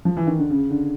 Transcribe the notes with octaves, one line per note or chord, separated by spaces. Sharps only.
F3
E3
D#3
D3
C#3
D3